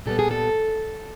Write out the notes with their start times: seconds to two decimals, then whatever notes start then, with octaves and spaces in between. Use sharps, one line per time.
0.06 A#2 G3 B3 A4
0.19 G#4
0.31 A4